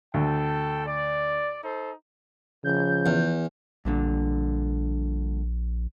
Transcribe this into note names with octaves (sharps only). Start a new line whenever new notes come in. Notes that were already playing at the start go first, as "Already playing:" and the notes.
D2 A4 G5 A5
D5
D#4 A4 C5
C#3 F3 G6
E2
A#1 G2 A#2 D3